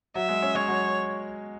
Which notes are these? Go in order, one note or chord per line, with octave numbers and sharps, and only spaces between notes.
F#3 E5
G#3
C#4
G#3 C#5
F#3